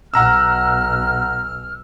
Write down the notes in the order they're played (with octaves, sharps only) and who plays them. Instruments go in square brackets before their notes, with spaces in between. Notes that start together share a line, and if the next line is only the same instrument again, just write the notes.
[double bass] B1 [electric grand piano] F#5 A#5 E6 [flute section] F6